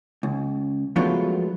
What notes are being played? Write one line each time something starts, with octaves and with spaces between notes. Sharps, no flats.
C#2
F3 F#3 G#3 A3 B3 F4